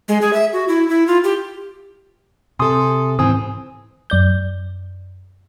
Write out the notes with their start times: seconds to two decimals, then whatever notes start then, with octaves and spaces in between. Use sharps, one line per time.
0.08 G#3
0.22 G#4
0.33 E5
0.53 F#4
0.68 E4
0.89 E4
1.07 F4
1.24 G4
2.59 C3 A4 G#5 C6 D#6
3.19 D#2 G#2 E3 C4 G#5 D#6
4.10 F#2 D5 G6